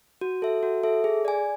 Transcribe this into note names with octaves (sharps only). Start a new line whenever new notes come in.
F#4
A4 E5
F#4
A4 E5
G#4
D5 G#5